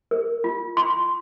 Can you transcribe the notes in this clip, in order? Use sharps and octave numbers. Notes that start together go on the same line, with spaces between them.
A#4
F4
F4 C6